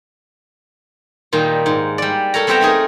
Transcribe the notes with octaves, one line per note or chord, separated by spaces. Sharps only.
A#2 D#3 G3 A#3
G#2
G3 D5
A4 A#4 C#5 A#5
G3 B3 C4 E5 G5 A#5
A3 D#4 G#4 A#4